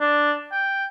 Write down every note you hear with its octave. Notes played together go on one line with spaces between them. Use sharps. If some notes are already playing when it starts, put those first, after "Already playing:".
D4
G5